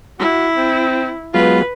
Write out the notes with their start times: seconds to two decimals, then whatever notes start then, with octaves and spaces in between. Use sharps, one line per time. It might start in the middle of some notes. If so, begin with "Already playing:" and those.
0.19 E4 F#4
0.56 C4
1.34 F#3 G#3 B3 F4 B4